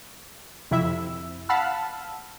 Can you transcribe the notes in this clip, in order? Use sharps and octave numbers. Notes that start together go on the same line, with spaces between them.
F2 C3 E4 E5
F5 F#5 A5 B5 E6 F6